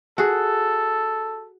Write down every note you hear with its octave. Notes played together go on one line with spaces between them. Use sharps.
F#4 G#4 A4